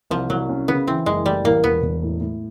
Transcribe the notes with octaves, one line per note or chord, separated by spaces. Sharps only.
C2 F3
C2 F#3
C#4
C#3 B3
E3 C4
F#1 G#3
G3 A3
A1 A#3
E1 B3
E1
A2
A2